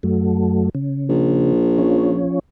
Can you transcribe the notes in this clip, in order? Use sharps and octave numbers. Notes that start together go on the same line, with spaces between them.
F#2 F#3 A3
C#3
A#1
F3 C#4